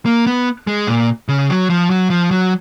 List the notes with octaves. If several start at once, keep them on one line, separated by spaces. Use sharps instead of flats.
A#3
B3
G#3
A#2
C#3
F#3
F3
F#3
F3
F#3